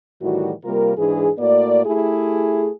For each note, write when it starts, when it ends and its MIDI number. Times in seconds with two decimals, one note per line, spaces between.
0.22 0.52 45
0.22 0.52 51
0.22 0.52 52
0.22 0.52 55
0.22 0.52 66
0.64 0.92 48
0.64 0.92 55
0.64 0.92 58
0.64 0.92 65
0.64 0.92 70
0.98 1.30 44
0.98 1.30 52
0.98 1.30 62
0.98 1.30 68
1.39 1.84 45
1.39 1.84 58
1.39 1.84 66
1.39 1.84 74
1.86 2.70 57
1.86 2.70 64
1.86 2.70 67
1.86 2.70 68